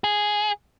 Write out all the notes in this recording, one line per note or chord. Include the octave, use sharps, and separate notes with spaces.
G#4